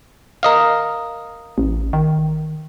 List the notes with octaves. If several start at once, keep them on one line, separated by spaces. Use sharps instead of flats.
A#4 D#5 F5
A1
D#3